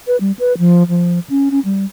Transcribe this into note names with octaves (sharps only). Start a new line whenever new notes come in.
B4
G3
B4
F3
F3
C#4
C#4
G3